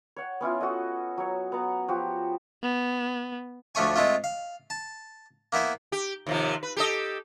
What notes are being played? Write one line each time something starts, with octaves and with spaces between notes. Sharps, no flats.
C#5 F#5
B3 C#4 E4 F4
F#4 A4 D#5
F#3 C#5
B3 F#5 A#5
F3 F#4 G4
B3
D2 F3 A3 C#5 G#5
G#3 A3 C4 F4
F5
A5
A#3 B3 E4 C5
G4
D#2 C3 F3
B4
G4 A4 D#5